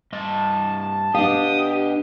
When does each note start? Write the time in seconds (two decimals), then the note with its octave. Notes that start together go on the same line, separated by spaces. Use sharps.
0.13 G2 D#5 A5
1.14 B2 D4 G4 F5 D#6